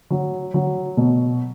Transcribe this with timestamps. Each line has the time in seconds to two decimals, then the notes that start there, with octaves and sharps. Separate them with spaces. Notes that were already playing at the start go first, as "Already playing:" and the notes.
0.11 F#3
0.54 F#3
0.97 B2